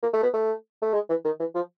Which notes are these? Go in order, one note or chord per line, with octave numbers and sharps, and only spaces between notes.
A#3
A3
B3
A3
A3
G#3
E3
D#3
E3
F3